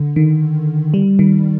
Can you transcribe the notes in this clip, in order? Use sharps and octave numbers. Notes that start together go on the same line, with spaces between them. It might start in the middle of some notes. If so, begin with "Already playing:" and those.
Already playing: D3
D#3
G3
D#3